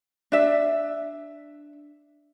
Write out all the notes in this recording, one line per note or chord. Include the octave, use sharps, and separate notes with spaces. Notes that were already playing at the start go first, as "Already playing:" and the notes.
D4 E5